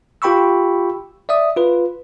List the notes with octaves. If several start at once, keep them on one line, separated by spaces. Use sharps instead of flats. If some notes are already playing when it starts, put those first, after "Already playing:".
F4 G4 G5 B5 C#6 E6
D5 E5 D#6
F4 B4